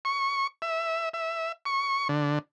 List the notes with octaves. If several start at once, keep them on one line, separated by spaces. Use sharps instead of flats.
C#6
E5
E5
C#6
D3